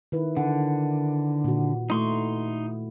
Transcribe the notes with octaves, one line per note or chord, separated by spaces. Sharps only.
D#3 E4 B4
D3 F#5
A#2 F#4
A3 D#4 E4 C6 C#6